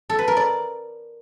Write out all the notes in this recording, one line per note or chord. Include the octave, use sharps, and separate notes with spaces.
A4
B4
A#4
D5